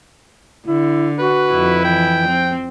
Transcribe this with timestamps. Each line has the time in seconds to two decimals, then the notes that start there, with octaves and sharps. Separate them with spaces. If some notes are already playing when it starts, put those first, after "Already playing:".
0.66 D3 E4
1.19 F#4 B4
1.50 F2 E4
1.85 E3 G5
2.27 F3 C4